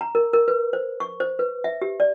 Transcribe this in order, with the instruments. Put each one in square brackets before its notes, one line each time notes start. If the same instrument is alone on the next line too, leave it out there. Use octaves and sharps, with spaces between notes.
[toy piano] A#5
A#4
A#4
B4
C5
C#6
C5
B4
E5
G4
D5